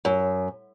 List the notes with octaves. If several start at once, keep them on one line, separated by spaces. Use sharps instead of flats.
F#2